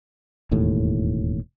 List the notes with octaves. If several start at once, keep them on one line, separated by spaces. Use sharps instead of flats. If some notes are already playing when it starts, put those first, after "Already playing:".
E1 D#2 A2